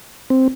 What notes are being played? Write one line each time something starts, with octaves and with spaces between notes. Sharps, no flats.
C4